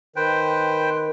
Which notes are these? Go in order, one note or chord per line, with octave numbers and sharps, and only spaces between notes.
D#3 B4 C5 G5